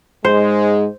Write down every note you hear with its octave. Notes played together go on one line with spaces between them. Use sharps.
G#2 G#3 C5